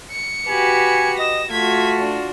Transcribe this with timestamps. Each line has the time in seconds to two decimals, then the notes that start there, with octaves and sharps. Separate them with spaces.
0.11 C#7
0.48 F#4 G4 B4 G#5
1.19 D#5 A#6 E7
1.51 A3 F4 F#4 G#6 B6
1.98 D4